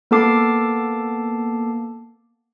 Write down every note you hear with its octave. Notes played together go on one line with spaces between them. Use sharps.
A#3 B3 A4 A5 D6 C7